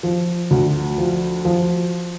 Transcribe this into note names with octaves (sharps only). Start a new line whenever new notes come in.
F3
D2
F3
F3